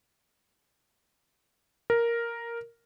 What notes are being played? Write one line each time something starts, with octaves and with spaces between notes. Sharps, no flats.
A#4